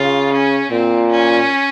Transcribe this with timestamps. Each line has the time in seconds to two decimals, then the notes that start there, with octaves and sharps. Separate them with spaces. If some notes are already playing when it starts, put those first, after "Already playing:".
Already playing: C#3 F4
0.33 C#4
0.71 A#2 C4
1.11 C#4